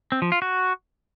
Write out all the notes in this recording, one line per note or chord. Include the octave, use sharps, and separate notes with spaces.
C4
F3
F4
F#4